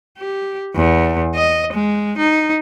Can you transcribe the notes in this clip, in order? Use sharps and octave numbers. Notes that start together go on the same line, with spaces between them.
G4
E2
D#5
G#3
D#4